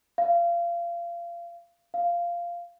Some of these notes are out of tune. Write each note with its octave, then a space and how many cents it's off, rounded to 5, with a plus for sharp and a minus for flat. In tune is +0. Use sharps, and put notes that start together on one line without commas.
F5 -25
F5 -10